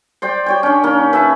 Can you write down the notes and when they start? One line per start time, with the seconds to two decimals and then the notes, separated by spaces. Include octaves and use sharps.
0.22 C5 D5 G5
0.46 G4 C#5 G5
0.63 C#4 D4
0.83 D#3 A#3 C#4
1.13 B4 E5 A5